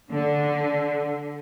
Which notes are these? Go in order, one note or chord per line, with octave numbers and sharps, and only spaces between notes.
D3